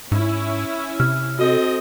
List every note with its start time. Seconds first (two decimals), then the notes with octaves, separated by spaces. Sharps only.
0.12 G#2 C#4 E4
1.00 C3 F6
1.39 C4 F#4 A4 D#5